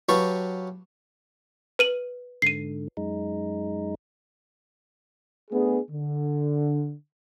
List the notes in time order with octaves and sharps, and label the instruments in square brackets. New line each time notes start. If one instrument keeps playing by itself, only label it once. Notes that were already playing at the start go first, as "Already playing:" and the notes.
[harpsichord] F#3 G4 B4 F5 A5 C#6
[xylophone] B4 D#7 F#7
[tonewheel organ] G#2 D3 [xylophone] C7 D#7
[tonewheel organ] F#2 G#3 D#4
[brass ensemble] A3 B3 D4 G#4
D3